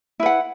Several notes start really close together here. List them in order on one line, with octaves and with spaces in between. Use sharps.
E4 B4 F#5